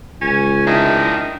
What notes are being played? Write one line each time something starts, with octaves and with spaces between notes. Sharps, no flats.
C#2 C#4
D#3 D4 E4